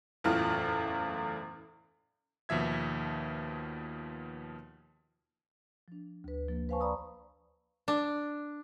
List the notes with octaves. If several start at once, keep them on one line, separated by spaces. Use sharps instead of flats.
F#1 E2 A2 F4 F6
D#2 B2 F3 E5 G#6
F3 D4
D2 B4
F3 A#3
B4 C5 F5 G#5 A5 C#6
D5 A#5 B5 C#6 D#6 E6
D4